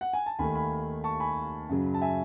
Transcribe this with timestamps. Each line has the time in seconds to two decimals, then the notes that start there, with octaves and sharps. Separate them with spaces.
0.01 F#5
0.13 G#5
0.26 A5
0.39 D#2 D#3 A3 G#5 B5
0.55 G#5 B5
1.04 A5 C#6
1.20 G#5 B5
1.69 F#2 C#3 F#3
1.94 A5
2.02 E5 G#5